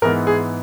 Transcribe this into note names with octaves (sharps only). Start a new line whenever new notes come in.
G#2 E3 G#3 B3 A#4
G#4